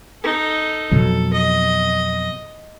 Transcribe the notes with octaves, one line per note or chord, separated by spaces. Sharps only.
D#4 A4
F2 B2 F#3 A4
D#5